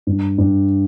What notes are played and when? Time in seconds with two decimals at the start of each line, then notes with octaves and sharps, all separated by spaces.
0.07 G2
0.38 G2